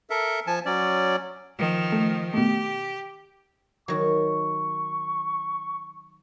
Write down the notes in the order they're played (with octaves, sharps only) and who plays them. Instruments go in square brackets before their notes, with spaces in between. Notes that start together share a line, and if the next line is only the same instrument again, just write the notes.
[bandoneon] A4 A#4 E5
F3 G#5 A5
F#3 C#4 D5
[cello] D#3 F3
[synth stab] A3
[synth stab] B2 A3 [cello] G4
[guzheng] D#3 F#3 [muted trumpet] C#6